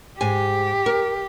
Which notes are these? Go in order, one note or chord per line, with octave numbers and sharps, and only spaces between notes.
G#2 G4 G#5
A#4